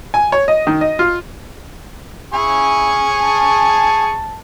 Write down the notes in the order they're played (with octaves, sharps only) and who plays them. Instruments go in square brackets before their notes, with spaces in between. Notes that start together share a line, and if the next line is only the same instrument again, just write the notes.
[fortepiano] G#5
C#5
D#5
D#3
D#5
F4
[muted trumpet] E4 [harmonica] G#4 G#5 C#6
[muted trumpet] A5